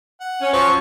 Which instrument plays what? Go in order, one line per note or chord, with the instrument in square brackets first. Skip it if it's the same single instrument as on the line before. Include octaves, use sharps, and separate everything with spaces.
[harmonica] F#5
[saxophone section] C#4
[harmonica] F3 F#3 C#6 [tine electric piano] C5